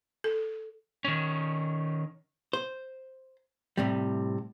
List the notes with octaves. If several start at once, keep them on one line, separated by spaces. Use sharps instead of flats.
A4
D#3 C#4
C5
A2 C3 G3